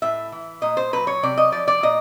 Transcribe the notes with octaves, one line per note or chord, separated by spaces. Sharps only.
A2 E5
E3
A#2 D#5
C5
F#3 B4
C#5
C3 D5
D#5
F3 D5
D5
A#2 D#5